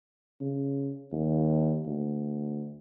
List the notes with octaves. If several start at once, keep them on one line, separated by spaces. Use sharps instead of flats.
C#3
D#2
D2